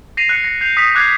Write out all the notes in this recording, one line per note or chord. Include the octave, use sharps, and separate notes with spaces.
A#6 C7 D#7 F7
F#6 C#7
A#6
G6 C7 F7
D#6 B6
D6 F#6 G#6 A6 C7